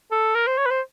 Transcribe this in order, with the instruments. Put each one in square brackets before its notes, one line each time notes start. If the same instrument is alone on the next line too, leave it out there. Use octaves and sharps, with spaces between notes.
[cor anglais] A4
A#4
C5
C#5
B4
C5